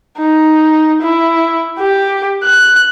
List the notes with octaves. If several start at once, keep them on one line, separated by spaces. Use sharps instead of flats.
D#4
E4
G4
F#6